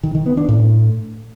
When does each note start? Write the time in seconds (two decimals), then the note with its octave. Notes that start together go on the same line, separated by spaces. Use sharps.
0.04 D#3
0.15 D#3
0.26 B3
0.37 D4
0.49 A2